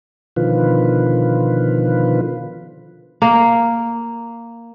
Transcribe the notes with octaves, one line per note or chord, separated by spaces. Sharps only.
B2 D3 D#3 F3 F4 B4
A#3